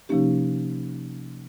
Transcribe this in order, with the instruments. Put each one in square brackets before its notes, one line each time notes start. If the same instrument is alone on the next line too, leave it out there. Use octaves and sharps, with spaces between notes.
[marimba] C3 F3 A#3 C#4 D#4 G4